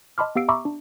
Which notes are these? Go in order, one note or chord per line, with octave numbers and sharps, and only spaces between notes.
D#5 A5 B5 C6 D6 F6
B3 G4 F5 E6 C7 D7
E5 A#5 B5 C#6 D6 E6
D4